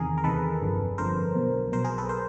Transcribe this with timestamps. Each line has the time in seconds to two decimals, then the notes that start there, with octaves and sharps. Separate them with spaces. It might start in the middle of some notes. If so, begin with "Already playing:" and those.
Already playing: E2 C3 D#3 G#4 A#4
0.18 A#4
0.24 E2 C3 D#3 A4 B4
0.62 G1 F2 D3
0.98 G1 F2 D3 A#4 C5
1.35 B1 B2
1.72 B1 B2 A#4 C5
1.85 G#4 A#4
1.98 A4 B4
2.09 A#4 C5